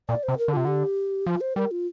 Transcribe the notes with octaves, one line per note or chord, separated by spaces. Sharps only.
A#2 D5
C5
C3
A#4
D3
C3 F4
D3 G4
F3 F4
C5
G3 A#4
F4